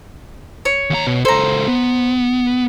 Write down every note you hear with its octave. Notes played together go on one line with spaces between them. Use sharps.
C#5
D#2 A#5
B2
C#2 A4 C5 A#5
B3